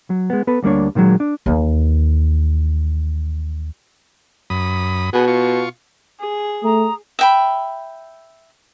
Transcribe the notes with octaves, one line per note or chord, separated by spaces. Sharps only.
F#3
G#3 B3
B3 A4 B4
D2 G3 A#3 D4 C#5
A#2 D#3 F3 F#3 G#3
D4
D#2 E3
F#2 B5 D#6
B2 G#4 F#5
F4 C#6
G#4
A3 A#5 D#6
E5 G5 B5